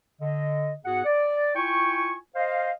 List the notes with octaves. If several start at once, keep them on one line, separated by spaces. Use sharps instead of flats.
D3 D#5
G#2 B3 F#4 G#4 F#5
D5
E4 F4 G5 G#5 C#6
C5 D#5 F5